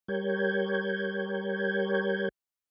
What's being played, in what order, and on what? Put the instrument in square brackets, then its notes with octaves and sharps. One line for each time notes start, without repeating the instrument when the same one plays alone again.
[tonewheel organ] G3 G4 A#4 C#5 G6 G#6